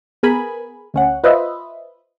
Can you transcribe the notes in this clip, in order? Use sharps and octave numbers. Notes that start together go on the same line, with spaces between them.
B3 G#4 A#4 G#5 B5
D2 C#4 F#5
F4 B4 C5 D#5 E5